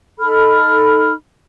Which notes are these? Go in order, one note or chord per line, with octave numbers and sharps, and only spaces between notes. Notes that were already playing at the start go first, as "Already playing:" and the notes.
D#4 A4 B5 F6